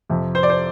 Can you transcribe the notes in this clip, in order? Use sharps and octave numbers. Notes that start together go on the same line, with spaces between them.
F2 C3 F3
C5
D5
C5